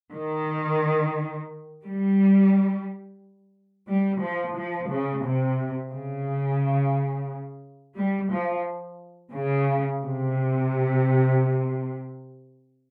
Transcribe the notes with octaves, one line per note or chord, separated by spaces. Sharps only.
D#3
G3
G3
F3
F3
C#3
C3
C#3
G3
F3
C#3
C3